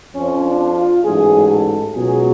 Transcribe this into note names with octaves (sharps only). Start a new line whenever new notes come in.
F2 F3 C#4
D4
F4
A1 G#2 F#3 G#4
A4
C#2 B2 F#3 G#4